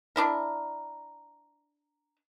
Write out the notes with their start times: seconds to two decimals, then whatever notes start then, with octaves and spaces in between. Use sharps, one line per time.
0.16 D4 E4 A#4